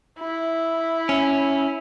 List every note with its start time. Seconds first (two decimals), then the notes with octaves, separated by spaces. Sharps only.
0.20 E4
1.09 C#4